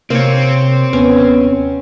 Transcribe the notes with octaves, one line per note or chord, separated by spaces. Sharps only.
C3 A#3 C4 C#5
D#2 B3 C#4